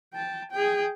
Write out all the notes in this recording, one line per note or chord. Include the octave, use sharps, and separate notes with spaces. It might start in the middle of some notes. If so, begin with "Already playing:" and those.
G5 A5
G#4 G5